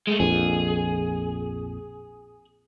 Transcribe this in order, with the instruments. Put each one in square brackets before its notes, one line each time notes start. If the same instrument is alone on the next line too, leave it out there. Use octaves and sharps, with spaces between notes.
[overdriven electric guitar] G#3 A3
[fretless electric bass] A#1 F2 [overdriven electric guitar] G#4